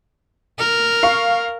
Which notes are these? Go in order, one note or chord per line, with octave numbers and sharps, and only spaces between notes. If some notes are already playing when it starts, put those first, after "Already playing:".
A#4
F5 C#6